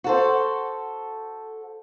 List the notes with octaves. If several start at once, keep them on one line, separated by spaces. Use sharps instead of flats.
F#4 A4 C5